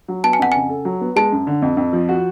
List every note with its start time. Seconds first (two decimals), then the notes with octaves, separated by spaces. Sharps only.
0.08 F#3
0.24 B3 A5
0.33 G#5
0.39 F2 F#5
0.52 C#3 G#5
0.69 A4
0.85 F#3
1.01 B3
1.16 G#3 A5
1.32 F#2
1.47 D3
1.62 F2
1.77 F2
1.93 F3
2.09 F#4